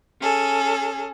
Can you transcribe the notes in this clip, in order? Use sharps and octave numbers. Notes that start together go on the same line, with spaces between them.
C#4 G#4 A4